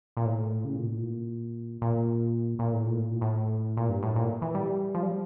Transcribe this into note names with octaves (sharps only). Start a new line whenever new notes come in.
A#2
A2
C#3
A#2
A2
A#2
A#2
A#2
A2
A#2
A2
A#2
A2
A#2
G2
A2
A#2
E3
G3
F3
G3